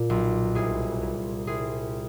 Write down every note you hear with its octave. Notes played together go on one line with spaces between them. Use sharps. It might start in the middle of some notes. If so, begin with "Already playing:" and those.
Already playing: A#2
B1
C2 G#4
A#2
C2 G#4